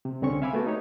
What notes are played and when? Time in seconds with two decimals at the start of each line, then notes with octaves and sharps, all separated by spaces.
0.05 C3
0.22 C2 D3 C4 C#4 C#6
0.42 E5 F5 G#5 B5 D6 E6
0.53 A3 B3 F#4
0.67 D#4 G4 C#5